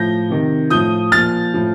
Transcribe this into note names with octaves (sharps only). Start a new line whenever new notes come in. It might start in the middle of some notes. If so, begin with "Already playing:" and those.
Already playing: A2 F3 G6 A#6
C3 D#3
A2 F3 D#6 G6
A#2 F3 F6 A6
A2 F3